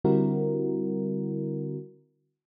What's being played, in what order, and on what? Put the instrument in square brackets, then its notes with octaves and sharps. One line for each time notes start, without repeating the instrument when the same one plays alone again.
[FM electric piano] D3 G3 C4 E4 F#4 A#4